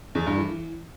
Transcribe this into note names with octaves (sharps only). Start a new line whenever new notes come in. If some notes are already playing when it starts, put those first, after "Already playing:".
E2
G2
E3